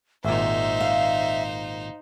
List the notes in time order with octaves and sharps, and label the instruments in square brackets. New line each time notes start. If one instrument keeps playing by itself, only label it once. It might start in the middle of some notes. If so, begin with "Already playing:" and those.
[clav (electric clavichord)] G#1 A#2 [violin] D#4 C5 [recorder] E5
[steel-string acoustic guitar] F5